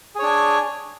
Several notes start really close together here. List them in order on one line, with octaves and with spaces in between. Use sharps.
G#4 C#5 D4 G#5